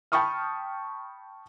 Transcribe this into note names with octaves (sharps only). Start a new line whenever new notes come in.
G5 A5 B5 C#6 D#6 F6